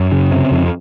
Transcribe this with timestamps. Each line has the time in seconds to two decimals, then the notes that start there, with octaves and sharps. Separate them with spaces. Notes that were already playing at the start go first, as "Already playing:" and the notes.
Already playing: F#2
0.12 C#3
0.31 C3
0.52 F2